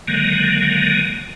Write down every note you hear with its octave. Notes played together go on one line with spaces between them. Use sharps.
D3 D#3 F#3 G#3 A#3